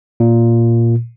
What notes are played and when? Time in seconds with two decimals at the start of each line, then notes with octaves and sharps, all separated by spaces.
0.20 A#2